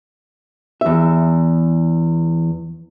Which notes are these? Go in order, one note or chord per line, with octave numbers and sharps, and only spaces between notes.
E2 E5